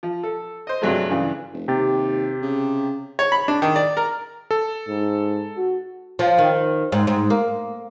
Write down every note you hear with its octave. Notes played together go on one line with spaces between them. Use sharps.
F3
A4
C5 D#5
G2 C3 F#3 G#3 A3
G2 C#3 E3
F1
D#2 C3 G4 A6
C#3
C#5
B5
D4
D#3
D5
A#4
A4
G#2
F#4
F3
D#3
G#2
G#2
A#3